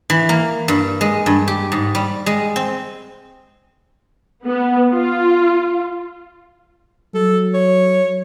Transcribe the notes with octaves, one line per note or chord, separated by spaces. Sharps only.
E3
A#3
G2
G#3
G2
G4
G#2
G3
G#3
C4
B3
F4
F#3 A4
C#5